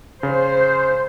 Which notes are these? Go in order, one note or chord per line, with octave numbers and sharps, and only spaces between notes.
C#3 C5